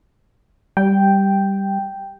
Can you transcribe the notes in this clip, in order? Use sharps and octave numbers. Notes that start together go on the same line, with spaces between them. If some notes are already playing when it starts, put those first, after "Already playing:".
G3 G5